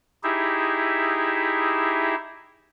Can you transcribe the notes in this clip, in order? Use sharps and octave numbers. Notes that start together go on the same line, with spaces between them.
D#4 E4 G4 G#4 E5